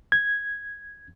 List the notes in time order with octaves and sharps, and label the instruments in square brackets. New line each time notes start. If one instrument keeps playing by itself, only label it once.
[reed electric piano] G#6